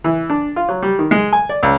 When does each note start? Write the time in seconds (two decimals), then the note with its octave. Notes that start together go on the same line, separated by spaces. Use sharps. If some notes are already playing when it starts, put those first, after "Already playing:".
0.04 E3
0.30 D4
0.56 F4
0.69 F#3
0.82 G3
0.99 D#3
1.11 G#3
1.33 G#5
1.49 D5
1.63 C#2